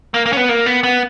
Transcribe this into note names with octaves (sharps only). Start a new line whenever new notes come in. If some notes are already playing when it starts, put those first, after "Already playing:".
A#3
A#3
C#4
B3
A#3
B3
B3